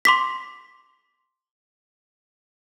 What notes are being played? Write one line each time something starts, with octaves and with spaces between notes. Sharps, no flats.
C6 D6 B6